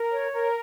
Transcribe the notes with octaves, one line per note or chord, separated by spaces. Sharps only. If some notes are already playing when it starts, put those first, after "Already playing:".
Already playing: A#4
C#5
A#4